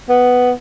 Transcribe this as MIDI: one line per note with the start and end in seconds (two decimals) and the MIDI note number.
0.09 0.52 59